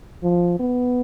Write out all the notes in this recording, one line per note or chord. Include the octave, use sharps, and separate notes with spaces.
F3
B3